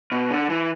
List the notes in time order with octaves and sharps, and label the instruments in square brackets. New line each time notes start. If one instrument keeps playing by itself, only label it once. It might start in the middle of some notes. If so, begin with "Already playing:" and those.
[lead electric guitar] B2
D3
E3